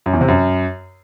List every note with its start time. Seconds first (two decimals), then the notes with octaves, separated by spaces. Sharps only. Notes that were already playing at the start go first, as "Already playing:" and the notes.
0.06 F#2
0.13 E2
0.21 C3
0.28 F#2